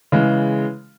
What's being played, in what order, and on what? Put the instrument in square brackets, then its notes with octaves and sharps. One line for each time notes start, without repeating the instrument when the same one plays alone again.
[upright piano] C#3 E3 G#3